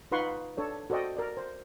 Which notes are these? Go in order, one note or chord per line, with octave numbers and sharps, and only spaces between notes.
D#4 F4 B4 F#5 C6 C#6
D4 A4 C#5
F#4 A4 C5 D5 D#5 G5
A#4 D5
C5